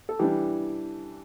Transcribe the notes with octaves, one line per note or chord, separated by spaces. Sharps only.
A4
E3 G3 D4 G4